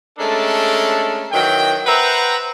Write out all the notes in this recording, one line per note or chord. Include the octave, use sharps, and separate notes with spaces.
G#3 A3 C#4 D4 A4 A#4
D#3 E3 F#3 G5
B4 C5 E5 F#5 G5 A#5